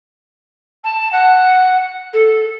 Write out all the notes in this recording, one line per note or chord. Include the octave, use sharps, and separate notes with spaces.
A5
F#5
A4